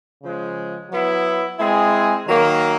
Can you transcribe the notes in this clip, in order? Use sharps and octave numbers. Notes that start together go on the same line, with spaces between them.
C#3 F3 G#3
F#3 B3 E4
G#3 C4 E4 G#4
D#3 F#3 A#3